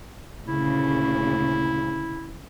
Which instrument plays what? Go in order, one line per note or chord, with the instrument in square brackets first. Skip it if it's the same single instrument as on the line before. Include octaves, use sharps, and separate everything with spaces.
[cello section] D2 A#2 C#3 [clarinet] E4